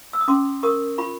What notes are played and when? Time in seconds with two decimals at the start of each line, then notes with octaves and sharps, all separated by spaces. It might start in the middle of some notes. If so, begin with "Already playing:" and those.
0.13 E6
0.21 D#6
0.28 C#4 C6 D6
0.63 A#4 C#6 D#6
0.98 F4 B5 C#6